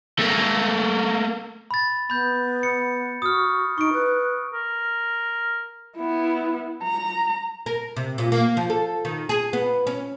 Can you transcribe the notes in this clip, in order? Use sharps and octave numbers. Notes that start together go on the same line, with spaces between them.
A3 A#3
B5 A6
B3 B5 G6
C#7
F#4 D#6 F6
D#4 C#6 D7
B4
A#4
B3 E4
A#5
A#4
C3
A#2
A#3
F3
A4
D#3
G#4
B3
C#4